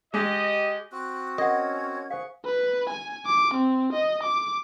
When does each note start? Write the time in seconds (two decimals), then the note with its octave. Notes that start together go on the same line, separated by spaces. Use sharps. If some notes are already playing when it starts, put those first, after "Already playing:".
0.14 G#3 G4 D#5
0.92 C4 F#4 F#6
1.38 C#4 A#4 C#5 D#5 F#5 G#6
2.11 G#4 C5 F5 C#6
2.46 B4
2.90 G#5
3.26 D6
3.54 C4
3.93 D#5
4.23 D6